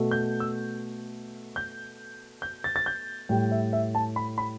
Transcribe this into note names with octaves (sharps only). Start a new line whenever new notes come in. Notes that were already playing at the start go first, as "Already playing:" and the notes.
Already playing: B2 A3
G6
E6
G6
G6
A6
A6
G6
A2 G3 G5
E5
E5
A5
B5
B5